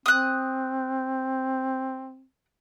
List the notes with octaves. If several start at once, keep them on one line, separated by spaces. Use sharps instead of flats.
C4 D#6 F#6